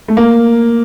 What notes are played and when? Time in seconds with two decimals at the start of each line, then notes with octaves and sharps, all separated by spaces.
0.08 A3
0.17 A#3